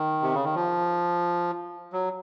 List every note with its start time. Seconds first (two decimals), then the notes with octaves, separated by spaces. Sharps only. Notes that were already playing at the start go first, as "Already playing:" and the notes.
Already playing: D#3
0.22 C3
0.34 C#3
0.44 D#3
0.55 F3
1.93 F#3